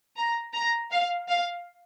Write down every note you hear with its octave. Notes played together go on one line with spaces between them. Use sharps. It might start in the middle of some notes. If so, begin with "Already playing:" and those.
A#5
A#5
F5
F5